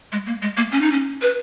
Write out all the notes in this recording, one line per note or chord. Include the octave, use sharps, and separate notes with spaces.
G#3
A#3
G#3
A#3
C#4
D#4
C#4
B4